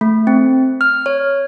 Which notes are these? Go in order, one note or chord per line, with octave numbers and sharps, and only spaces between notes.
A3
C4
F6
C#5